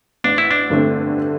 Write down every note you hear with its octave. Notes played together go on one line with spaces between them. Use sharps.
A1 D4
E4
D4
G2 D3 A3 C4